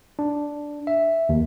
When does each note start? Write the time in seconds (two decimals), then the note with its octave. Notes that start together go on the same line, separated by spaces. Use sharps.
0.19 D4
0.87 E5
1.29 D#2